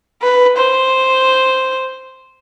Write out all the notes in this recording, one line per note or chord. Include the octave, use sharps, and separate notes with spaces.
B4
C5